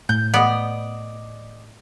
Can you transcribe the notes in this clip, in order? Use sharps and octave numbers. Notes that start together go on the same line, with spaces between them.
A2 G6
B3 D5 D#5